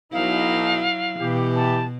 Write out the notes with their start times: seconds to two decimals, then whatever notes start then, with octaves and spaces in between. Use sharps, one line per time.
0.13 B1 B2 F#3 D#4 E4 F5
1.20 B2 E3 G4
1.56 A5